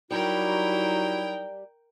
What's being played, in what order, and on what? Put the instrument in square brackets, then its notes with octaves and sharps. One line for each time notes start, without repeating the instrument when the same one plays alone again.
[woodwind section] F#3 D#4 E4 [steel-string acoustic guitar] G3 G4 [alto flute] F#4 [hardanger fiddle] A#4 G5